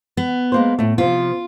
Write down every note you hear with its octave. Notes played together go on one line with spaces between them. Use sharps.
B3
G#3 A#3 C5
A2 A3
C3 F3 F4